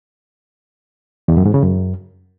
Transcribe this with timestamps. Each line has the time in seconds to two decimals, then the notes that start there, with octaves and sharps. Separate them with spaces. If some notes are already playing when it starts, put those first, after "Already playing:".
1.28 E2
1.37 F#2
1.45 G#2
1.54 C#3
1.63 F#2